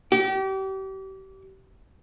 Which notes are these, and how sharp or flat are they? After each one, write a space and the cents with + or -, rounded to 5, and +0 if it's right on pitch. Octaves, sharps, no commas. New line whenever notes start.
G4 -35